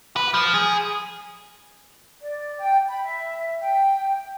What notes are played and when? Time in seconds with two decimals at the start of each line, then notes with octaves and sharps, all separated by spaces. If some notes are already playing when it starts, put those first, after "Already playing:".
0.16 B4
0.34 F3
0.54 G#4
2.21 D5
2.59 G5
2.88 B5
3.04 E5
3.59 G5